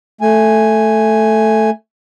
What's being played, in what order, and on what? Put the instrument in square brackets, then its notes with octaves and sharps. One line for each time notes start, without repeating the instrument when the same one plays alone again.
[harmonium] A3 G#5